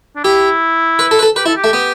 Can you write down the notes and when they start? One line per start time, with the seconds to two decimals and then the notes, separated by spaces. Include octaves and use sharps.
0.16 D4
0.24 E4 G4
0.99 B4
1.11 A4
1.19 B4
1.23 A4
1.36 G4 B4
1.46 E4 A4
1.57 G4
1.64 A3
1.73 B3